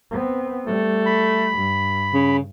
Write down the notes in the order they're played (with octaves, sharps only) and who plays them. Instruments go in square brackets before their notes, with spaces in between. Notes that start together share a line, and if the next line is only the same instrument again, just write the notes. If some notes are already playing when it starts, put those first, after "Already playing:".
[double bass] B3 C4
[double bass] G3 [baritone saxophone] A3
[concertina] B5
[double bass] G2
[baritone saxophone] C#3